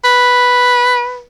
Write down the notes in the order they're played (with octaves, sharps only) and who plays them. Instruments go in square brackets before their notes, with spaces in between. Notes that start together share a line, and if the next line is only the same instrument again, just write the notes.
[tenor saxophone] B4